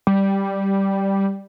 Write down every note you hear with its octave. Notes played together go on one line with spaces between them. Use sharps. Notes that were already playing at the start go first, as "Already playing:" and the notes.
G3